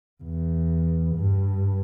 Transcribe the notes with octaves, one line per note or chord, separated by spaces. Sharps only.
E2
G2